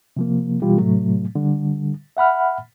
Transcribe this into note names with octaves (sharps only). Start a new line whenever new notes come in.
C3 F3 A#3
B2 E3 G3 F4 G4
A2 C3 F#3 A3
D3 G3
E5 F#5 B5 F6